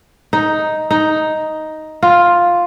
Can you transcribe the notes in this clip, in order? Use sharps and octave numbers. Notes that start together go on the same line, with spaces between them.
D#4
D#4
F4